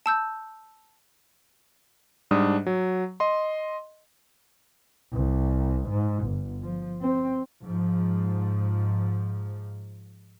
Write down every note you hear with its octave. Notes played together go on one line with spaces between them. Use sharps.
A5 E6 G6
G#2 G3 D4 D#6
F#3
D#5 C6
C2
G#2
G1
F3
C4
G#2 F3